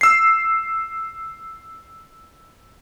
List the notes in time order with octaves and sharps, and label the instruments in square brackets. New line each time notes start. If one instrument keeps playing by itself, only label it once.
[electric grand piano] E6 C7